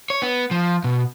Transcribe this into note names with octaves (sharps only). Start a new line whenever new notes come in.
C#5
B3
F3
B2